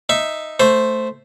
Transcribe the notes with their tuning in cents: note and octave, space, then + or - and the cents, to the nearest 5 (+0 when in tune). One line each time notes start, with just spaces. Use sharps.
D#4 +0 E5 +0
A3 +0 C5 +0